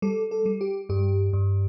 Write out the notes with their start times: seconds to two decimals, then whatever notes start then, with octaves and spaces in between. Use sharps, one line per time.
0.02 G3 A4
0.31 A4
0.46 G3
0.61 G4
0.89 G2 G4
1.33 G2